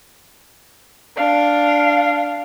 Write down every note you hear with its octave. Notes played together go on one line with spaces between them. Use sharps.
D4 F5